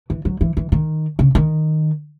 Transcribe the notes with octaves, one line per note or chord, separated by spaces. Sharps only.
E3
F#3
E3
E3
D#3
C#3
D#3